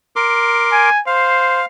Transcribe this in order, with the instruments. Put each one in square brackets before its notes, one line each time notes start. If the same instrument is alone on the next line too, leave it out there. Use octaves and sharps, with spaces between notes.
[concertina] A#4 C6 D6
[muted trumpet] G#5
[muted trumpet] C5 [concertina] F5